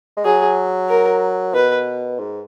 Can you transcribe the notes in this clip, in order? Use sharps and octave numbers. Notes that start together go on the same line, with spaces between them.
G#3
F#3 G#4
A#4
B2 B4
G#2